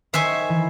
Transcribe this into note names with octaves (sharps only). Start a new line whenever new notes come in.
D#3 C5 E5 G#5 C#6
E3